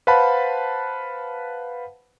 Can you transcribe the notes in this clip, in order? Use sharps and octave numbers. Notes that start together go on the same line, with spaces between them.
B4 C5 F5 F#5 A5 B5